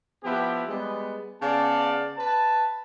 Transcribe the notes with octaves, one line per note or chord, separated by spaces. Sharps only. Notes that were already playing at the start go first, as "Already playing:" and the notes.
F3 B3 E4 G4
G3 G#3 B3
C#3 B3 D5 F5 A5
B4 A5